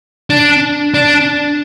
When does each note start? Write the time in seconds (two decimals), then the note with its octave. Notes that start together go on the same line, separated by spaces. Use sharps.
0.30 D4
0.94 D4